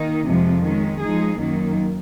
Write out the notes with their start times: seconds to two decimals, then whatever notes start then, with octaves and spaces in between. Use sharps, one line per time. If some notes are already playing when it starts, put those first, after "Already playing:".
Already playing: D#3 A#3 D#4
0.27 F2 C3 F3 G#3
0.64 D#3 G#3 C#4
1.01 F3 G#3 D#4 G#4
1.38 F#2 D#3 F#3 A#3